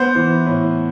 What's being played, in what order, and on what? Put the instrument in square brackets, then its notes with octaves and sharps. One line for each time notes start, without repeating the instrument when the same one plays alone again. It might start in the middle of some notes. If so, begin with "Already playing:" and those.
Already playing: [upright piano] B3 [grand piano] C5
[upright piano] E3
A2